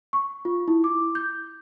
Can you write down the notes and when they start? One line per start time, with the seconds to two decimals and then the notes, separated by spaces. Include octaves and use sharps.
0.13 C#6
0.45 F4
0.68 E4
0.84 D6
1.15 G6